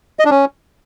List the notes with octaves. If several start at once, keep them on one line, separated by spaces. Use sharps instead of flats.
D#5
D4
C#4